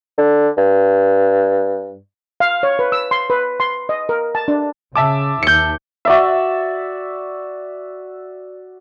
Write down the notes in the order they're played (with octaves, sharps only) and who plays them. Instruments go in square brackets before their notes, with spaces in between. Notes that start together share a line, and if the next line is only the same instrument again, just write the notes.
[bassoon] D3
G2
[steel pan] F5
C#5
B4
E6
C6
B4
C6
D#5
A#4
A5
D4
[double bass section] C#3 [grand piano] E5 A5 D6
[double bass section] D#2 [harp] G6 C#7
[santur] F#4 D5 E5